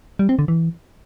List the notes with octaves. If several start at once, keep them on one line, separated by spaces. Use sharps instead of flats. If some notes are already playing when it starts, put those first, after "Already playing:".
G3
C4
D3
E3